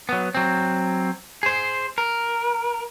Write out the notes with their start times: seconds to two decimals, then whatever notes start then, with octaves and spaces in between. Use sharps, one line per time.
0.09 F#3 B3
0.35 F#3 C4
1.43 G#4 C5
1.98 A#4